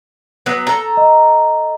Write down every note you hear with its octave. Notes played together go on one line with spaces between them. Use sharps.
F#3 B3
A4 A#5
D#5